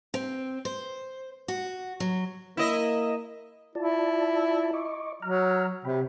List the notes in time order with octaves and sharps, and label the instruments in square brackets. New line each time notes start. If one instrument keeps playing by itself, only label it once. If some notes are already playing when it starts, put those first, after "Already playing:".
[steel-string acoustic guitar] C4
C5
F#4
F#3
[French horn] A#3 [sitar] E4 D#5
[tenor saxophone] E4 [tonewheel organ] F4 D5 A5
[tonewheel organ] D#5 C#6 D6
[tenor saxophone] F#3 [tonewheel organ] A#5 F6
[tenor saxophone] C3 [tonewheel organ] G5 B5